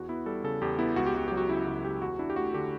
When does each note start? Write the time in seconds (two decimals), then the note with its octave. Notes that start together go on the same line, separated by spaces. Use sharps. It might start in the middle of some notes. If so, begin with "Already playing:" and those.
Already playing: E2 F#4
0.09 B3 E4
0.26 G3 A4
0.44 C#3 A4
0.61 E2 G4
0.78 B3 E4
0.96 C#2 F#4
1.06 G4
1.14 C#2 F#4
1.28 F#3 G4
1.37 F#4
1.49 C#3 E4
1.67 C#2 F#4
1.84 C#2 G4
2.01 E2 F#4
2.19 D4 E4
2.30 G4
2.36 A3 F#4
2.54 D3 G4